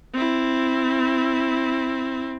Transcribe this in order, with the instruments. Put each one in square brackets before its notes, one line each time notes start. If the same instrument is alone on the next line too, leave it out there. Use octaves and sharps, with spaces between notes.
[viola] C4 E4